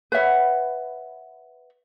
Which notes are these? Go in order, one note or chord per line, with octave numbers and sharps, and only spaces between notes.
B4 C#5 E5 F#5